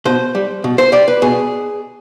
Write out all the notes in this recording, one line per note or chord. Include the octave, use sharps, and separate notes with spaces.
B2 C5
G3
B2
C5
G3 D5
B4
B2 G#4